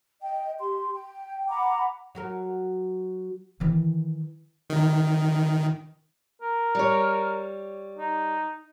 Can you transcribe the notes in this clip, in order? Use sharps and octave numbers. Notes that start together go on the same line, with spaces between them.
D#5 G5
G4 C6
G5
F#5 A#5 B5 D6
F#3 F#4 A#4
D#3 E3
D#3
A#4
G3 C#5
D#4